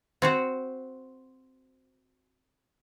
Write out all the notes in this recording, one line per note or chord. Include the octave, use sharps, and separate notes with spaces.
C4 F#4 C5